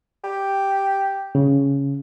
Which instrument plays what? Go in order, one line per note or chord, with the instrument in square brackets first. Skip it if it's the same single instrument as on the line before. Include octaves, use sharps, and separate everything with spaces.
[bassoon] G4
[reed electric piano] C#3